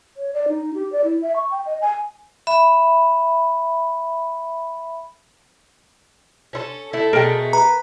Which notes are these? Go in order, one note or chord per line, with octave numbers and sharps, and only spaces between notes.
C#5
D5
D#4
G4
D5
E4
E5
C#6
G5
D#5
G#5
E5 B5
C#4 E4 A4
A3 E4 A4
B2 G#3 A3 A#4 G5
B4 A#5